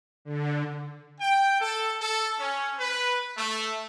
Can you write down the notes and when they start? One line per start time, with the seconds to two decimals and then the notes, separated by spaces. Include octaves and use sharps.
0.25 D3
1.21 G5
1.60 A4
2.01 A4
2.39 C#4
2.79 B4
3.37 A3